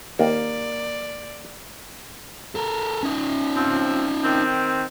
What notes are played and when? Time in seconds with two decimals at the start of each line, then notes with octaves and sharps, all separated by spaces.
0.19 D#2 A#3 D5
2.55 A4 A#4
3.03 C#4 D#4
3.56 F3 C4
4.24 D#3 C4